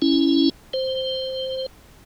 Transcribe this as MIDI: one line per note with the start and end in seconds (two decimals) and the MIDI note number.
0.02 0.49 61
0.02 0.49 64
0.74 1.66 72